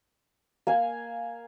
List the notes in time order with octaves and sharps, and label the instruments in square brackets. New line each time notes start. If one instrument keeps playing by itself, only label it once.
[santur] A#3 F5 G#5